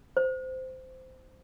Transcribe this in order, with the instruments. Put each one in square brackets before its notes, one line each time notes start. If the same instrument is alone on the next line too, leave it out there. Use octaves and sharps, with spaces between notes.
[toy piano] C5